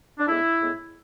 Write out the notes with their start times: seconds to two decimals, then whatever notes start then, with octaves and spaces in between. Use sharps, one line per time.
0.19 D4
0.28 A2 G#3 B3 E4
0.60 A2 G#3 B3